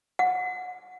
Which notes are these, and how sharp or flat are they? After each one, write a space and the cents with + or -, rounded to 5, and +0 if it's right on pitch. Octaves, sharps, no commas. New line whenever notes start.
F#5 -15